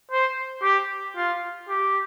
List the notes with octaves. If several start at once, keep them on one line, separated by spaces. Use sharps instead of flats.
C5
G4
F4
G4